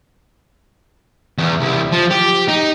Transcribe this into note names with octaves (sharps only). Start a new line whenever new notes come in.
E2
C2
F3
G4
D#4